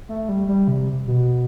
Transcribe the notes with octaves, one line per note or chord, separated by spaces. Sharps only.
A3
G3
G3
C3
B2